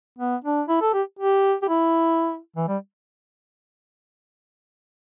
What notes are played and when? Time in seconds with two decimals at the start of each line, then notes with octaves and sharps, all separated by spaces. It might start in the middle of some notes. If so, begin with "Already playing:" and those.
0.19 B3
0.44 D4
0.69 E4
0.81 A4
0.93 G4
1.19 G4
1.62 G4
1.68 E4
2.56 E3
2.68 G3